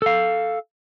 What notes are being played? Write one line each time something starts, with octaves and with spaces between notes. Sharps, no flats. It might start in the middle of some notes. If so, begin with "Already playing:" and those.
A4 F5